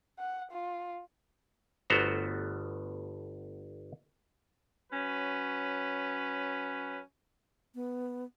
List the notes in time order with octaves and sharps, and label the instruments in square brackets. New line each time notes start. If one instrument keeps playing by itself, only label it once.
[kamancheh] F#5
F4
[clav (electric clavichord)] G1 A3 B3 F#4 C5 A#5
[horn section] F#3 C#4 B4
[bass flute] B3